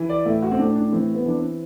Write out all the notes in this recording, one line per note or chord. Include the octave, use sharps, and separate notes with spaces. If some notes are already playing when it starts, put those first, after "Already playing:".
Already playing: E3
D5
A2 E4
F#4
C4
A2 D4
D4
E3 C4
B3
E3 D4
C4